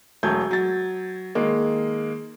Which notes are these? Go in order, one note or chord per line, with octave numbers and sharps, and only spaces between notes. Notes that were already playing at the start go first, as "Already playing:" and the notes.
E1 F#3 A3 G6 G#6
F#3 A6
D#3 G#3 A#3